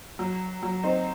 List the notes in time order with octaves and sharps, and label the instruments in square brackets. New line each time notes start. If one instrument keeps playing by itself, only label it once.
[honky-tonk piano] F#3
F#3
C4 D#4